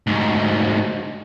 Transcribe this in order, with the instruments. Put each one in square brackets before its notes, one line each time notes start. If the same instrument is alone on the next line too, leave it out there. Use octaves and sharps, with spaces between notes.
[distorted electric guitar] D2 G#2